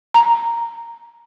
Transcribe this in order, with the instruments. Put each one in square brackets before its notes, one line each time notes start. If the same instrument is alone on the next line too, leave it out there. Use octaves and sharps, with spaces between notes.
[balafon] A#5